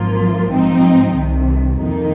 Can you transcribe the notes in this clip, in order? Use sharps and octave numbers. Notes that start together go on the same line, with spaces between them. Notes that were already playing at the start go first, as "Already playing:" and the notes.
Already playing: G#1 G#2 F3 A#3 F4
A#1 G#2 F3 C4 D#4
C2 C3 D#3
F2 D#3 A#3 D#4